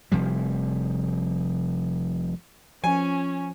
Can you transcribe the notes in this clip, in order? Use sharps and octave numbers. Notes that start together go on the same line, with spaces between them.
F1 C3 F3 G3
F3 C#4 G#5